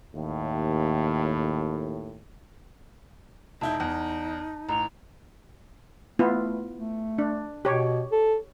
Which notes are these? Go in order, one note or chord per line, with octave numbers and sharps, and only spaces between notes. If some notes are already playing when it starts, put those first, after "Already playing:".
D#2 A2
E1 D#4 E4 A5 G6
E2
A1 A#5 F7
A3 B3 E4 F4
A3
D4
B2 G4 C#5
A4